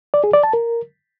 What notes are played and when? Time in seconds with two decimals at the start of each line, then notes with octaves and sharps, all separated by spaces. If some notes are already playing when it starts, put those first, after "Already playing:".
0.14 D5
0.24 G#4
0.34 D5
0.43 A5
0.53 A#4